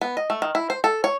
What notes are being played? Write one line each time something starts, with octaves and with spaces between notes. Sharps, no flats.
B3
D#5
A3
D#3
E4
C5
A4
C#5